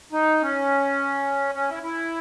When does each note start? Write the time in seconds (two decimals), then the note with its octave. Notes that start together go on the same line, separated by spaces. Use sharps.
0.12 D#4
0.42 C#4
1.55 C#4
1.70 E4
1.83 E4